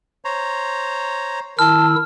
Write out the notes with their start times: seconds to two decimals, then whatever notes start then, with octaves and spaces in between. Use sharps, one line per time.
0.25 C5 C#5 A#5
1.59 D#3 E4 A5 E6 F6